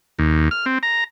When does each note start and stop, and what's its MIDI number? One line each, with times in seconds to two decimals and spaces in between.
0.19 0.49 39
0.51 0.65 89
0.66 0.78 60
0.83 1.04 82